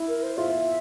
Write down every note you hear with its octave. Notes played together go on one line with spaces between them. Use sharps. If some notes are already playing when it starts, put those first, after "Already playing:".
Already playing: E4
A#4
C5
F4 E5